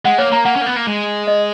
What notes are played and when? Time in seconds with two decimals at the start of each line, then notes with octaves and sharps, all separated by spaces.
0.05 G#3 F#5
0.18 A#3 C#5
0.32 A#3 A#5
0.45 A#3 F#5
0.56 C#4
0.61 A#3
0.66 B3
0.76 A#3
0.87 G#3
1.27 D#5